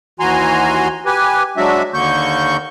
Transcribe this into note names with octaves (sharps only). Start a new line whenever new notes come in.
D#2 E3 F#4 G#5 A#5 C6
G4 B4 G#5
F#3 G#3 D4 F#4 E5
D#2 D3 A#3 C#6 G6